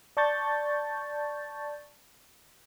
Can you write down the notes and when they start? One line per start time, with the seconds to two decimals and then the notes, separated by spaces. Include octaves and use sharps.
0.17 D5 A5 C#6 G6 A6